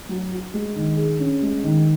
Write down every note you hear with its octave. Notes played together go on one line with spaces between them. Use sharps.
F#3
F#4
G#3
D#3
G#4
C#4
G#3
D#3